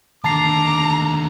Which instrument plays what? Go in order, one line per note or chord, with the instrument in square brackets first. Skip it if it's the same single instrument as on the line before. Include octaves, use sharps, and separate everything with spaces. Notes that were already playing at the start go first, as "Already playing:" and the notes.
[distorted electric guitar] D#2 D3 [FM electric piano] A5 C7 [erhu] A#5 [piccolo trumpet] D6